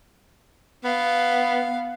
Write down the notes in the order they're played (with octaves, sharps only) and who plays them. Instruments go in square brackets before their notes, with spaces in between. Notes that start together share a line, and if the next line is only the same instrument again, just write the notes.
[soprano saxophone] B3 [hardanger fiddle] F5